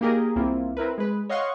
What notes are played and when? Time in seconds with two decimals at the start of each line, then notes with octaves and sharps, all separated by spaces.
0.01 A#3 D#4 G4 G#4 A#4 D#5
0.36 C2 A#3 C4 E4 F4
0.77 C4 E4 A#4 B4
0.98 G#3 B4
1.29 C#5 D#5 F5 F#5 C6 C#6